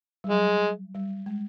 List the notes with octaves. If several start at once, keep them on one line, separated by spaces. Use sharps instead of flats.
G3
F#3 G#3
G3
G#3